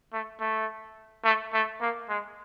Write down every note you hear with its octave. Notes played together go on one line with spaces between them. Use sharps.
A3
A3
A3
A3
A#3
G#3